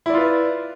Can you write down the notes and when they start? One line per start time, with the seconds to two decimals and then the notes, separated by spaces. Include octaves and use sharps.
0.06 E4
0.10 D5
0.14 F4
0.17 B4